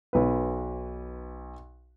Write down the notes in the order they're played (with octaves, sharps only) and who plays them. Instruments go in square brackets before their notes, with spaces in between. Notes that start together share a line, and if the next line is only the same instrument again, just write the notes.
[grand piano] B1 B4